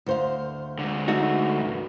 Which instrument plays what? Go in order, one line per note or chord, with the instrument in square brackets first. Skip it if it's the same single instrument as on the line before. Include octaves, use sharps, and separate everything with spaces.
[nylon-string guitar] D2 C5 F5
[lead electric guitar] D3 G#3
[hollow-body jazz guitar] A3 D#4 F#4
[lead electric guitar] C2 G2